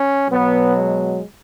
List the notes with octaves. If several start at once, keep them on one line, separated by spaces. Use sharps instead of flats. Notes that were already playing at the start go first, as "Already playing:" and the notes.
Already playing: C#4
B2 F#3 B3
G#3